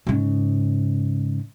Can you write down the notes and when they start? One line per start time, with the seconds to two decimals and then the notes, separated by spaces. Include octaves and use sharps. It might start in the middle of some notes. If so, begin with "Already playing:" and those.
0.07 G#2 C#3